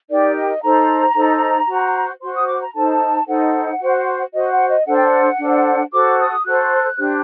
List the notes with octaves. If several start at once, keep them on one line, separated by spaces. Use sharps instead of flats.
D#4 G4 A#4 D5
D#5
D#4 A4 C5 A#5
D#4 A4 C5
F#4 C5
F#4 C5 C6
D#6
D6
A#5
D#4 A4 C5 A5
D#4 A4 C5 F#5
F#4 C5
F#4 C5 D#5
F#5
D#5
D4 A4 C5 F#5
G5
F#5
D4 A4 C5
F#4 A4 C5 D6
D#6
F#4 A4 C5 F#6
D4 G4 C5